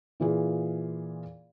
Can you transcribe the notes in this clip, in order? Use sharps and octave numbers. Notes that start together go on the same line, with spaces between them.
A#2 E3 F4 G#4